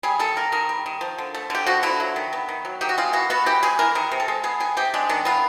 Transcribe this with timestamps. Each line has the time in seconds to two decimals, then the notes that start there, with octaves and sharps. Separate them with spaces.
0.03 G3 G#4
0.19 D#3 A4
0.36 A#3 A#4
0.52 D#3 A#4
0.69 G3
0.86 D#3
1.01 F3
1.18 D3
1.35 A3
1.50 D3 G4
1.66 F3 F#4
1.83 D3 E4
2.00 F#3
2.16 D#3
2.33 B3
2.49 D#3
2.65 F#3
2.81 D#3 G4
2.89 F#4
2.98 G#3 F4
3.13 E3 F#4
3.30 B3 F#4
3.46 E3 G4
3.63 G#3 G#4
3.79 E3 A#4
3.95 D#3 A#4
4.12 C3
4.20 A4
4.28 G#3
4.44 B3 G#4
4.60 D#3 G#4
4.77 C3 G4
4.94 G#3 D4
5.09 D#3 D4
5.25 B3 F4